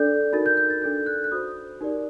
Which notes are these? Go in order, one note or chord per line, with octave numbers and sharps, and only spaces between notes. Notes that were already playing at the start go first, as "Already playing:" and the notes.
Already playing: D4 A4 D5 G6
D#4 F#4 A#4 A6
G6
G6
A6
D4 A4 D5 G6
F#6
F#6
F#4 C5 D#6
D#4 G4 A#4 D5